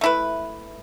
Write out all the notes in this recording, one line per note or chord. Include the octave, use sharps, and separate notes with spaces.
A3 E4 B4